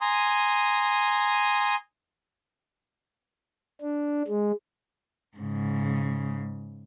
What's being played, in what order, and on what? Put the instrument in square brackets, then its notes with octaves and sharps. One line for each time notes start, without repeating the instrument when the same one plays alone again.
[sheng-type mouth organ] G#5 A#5 C6 D#6
[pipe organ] D4
G#3
[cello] G#2 C#3